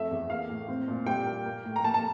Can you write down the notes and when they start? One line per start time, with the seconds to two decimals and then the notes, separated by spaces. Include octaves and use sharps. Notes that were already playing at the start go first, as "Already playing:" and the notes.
Already playing: F2 A3 E5
0.11 E2
0.30 A#3 F5
0.49 A2
0.68 C4
0.88 A#2
1.06 G3 G5
1.26 A#3
1.46 A#3
1.65 A2
1.76 A#5
1.84 A#3 A5
1.94 A5